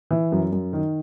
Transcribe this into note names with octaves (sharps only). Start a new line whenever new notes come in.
E3
F#2
F#2
D#3